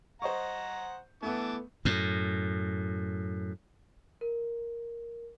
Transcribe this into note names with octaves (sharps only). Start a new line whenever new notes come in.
C5 D#5 F#5 A#5 C#6
E3 A3 B3 A5 D6
F#2 A2
A#4